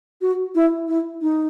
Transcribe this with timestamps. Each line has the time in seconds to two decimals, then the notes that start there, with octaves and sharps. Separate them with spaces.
0.22 F#4
0.55 E4
0.88 E4
1.22 D#4